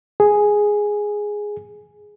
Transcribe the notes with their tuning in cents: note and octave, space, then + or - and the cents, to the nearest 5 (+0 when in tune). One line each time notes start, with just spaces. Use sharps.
G#4 +0